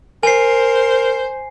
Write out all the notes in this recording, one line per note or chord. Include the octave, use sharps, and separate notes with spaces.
A#4 C5 G#5 C7